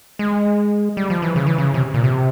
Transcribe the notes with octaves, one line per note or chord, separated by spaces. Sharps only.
G#3
G3
F3
E3
C#3
E3
C#3
C3
A#2
C3